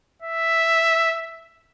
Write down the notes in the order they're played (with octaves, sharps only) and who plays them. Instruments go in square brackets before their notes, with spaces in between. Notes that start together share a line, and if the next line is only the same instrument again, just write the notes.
[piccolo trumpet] E5